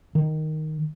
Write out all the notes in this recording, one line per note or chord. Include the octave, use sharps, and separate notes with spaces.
D#3